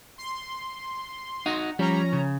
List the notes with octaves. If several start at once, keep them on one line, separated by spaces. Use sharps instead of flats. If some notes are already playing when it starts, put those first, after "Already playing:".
C6
D#4 F#4 F#5
F3 G3 C#4 C#5 A#5
C#3